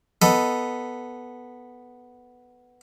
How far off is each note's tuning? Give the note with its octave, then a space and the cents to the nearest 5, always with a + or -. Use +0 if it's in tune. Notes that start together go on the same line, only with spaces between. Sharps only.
B3 +0 A4 +0 D#5 +0